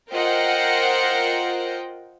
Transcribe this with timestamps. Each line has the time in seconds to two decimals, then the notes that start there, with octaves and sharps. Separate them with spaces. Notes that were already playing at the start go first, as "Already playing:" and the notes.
0.12 F4 A#4 C5 D#5 F#5 G5